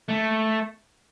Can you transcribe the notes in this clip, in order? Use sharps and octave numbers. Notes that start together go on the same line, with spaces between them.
A3